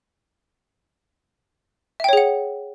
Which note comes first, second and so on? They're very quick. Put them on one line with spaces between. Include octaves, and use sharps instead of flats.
E5 G5 C#5 G#4 F#5